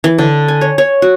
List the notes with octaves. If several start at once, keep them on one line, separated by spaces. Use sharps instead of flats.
E3
D3
G#5
C#5
C#5
F#4